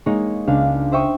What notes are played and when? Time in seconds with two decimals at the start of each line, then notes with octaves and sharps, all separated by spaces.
0.06 G#3 A#3 D#4 C#5
0.47 C#2 D4 F5
0.92 C5 E5 G5 C#6 D#6